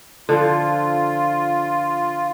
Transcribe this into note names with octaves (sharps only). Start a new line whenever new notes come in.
D3 F3 F4